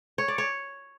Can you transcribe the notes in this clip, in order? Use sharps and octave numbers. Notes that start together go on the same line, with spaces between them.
C#5
D5
C#5